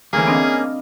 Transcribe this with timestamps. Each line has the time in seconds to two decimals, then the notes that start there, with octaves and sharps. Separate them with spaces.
0.13 D2 E3 A#3 C#4 G#4
0.28 C4 D4 D#5 F5